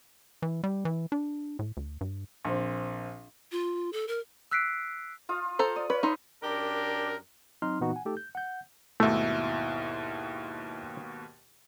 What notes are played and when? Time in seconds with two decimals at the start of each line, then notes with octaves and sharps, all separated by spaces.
0.42 E3
0.64 G3
0.85 E3
1.12 D4
1.59 A2
1.77 D2
2.01 G2
2.45 A#1 C4
3.52 F4
3.93 A4
4.08 A#4
4.51 E6 F#6 B6 C7 D7
5.29 F4 F5 D#6
5.59 A4 C5 A#5
5.76 D5 D#6
5.90 B4 C#5
6.03 D#4 B4 E5 C6
6.43 F#2 D4 G4 A#4
7.62 F#3 C4 D#4 C6 F6
7.80 A#2 E3 B3 D#4 F#4
7.93 F#5 G#5
8.05 A3 D#4 G4 A4
8.17 G6
8.35 F#5 G6
9.00 D#2 G#2 B2 A3 E4 E5